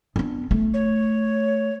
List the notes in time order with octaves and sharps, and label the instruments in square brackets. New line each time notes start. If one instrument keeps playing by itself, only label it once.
[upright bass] B3 D4
A3
[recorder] C#5